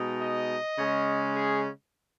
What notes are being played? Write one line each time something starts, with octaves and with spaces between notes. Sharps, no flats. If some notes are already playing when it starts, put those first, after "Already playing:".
Already playing: B2 G#3 D#4
D#5
C#3 G#3 C#4
G#4